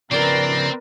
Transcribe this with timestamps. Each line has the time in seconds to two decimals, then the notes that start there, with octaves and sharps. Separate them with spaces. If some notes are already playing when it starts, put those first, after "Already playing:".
0.11 C#3 F3 B3 C4 A#4 B4 D5 A#5